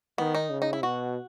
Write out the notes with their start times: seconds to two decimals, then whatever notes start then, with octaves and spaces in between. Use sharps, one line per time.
0.18 D#3 B3
0.34 D#4
0.51 C#3
0.62 D#4
0.73 E4
0.83 B2 F#4